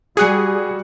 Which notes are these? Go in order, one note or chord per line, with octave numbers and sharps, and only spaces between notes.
G3 F#4 G#4 F#6 C#7